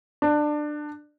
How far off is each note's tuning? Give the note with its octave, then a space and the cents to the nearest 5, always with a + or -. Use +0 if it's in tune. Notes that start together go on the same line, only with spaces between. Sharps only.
D4 +20